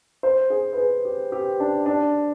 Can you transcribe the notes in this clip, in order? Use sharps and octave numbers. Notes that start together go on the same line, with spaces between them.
C5
G#4
B4
G#4
G4
G4
D4
D4